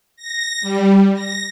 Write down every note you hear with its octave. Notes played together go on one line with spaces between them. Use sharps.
A#6
G3
A#6